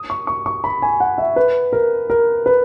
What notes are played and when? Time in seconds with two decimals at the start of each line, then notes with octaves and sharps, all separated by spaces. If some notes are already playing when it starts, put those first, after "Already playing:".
Already playing: D#6
0.10 C#6
0.27 C#6
0.46 C#6
0.64 B5
0.82 G#5
1.00 F#5
1.18 E5
1.36 B4
1.73 A#4
2.10 A#4
2.46 B4